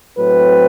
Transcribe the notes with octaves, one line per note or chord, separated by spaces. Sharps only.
A2 F#3 C4 B4